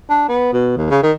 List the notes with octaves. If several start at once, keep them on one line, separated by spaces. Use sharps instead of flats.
D4
B3
B2
D#2
C#3
D#3